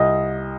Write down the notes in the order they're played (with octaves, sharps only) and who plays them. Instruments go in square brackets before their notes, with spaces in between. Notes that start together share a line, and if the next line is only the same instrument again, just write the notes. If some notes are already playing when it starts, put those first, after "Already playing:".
Already playing: [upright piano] C2 D#5